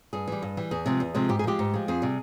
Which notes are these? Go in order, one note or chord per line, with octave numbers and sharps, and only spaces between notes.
G2 G#4
E3 G3
G2
E3 G3
E2 G#4
C3 F3 G#3
E2
C3 F3 G#3
G#2 G4
G#4
F3 G#3 G4
G#2
F3 G#3
F2 G#4
C3 G3